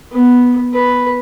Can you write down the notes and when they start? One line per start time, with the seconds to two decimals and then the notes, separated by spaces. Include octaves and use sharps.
0.12 B3
0.73 B4